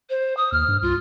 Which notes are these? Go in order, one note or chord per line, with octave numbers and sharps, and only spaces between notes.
C5
D#6
D#2 F6
G2
C2 F4